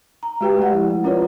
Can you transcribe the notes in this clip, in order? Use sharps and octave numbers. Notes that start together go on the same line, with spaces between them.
A#5
G#3 F#4 G4 B4 G5
G#3 A3 D5 F#5
F3 E4
E4
C#4 F4 A#4 B4 C#5 D5